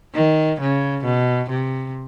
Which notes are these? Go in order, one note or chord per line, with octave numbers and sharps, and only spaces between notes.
D#3
C#3
B2
C3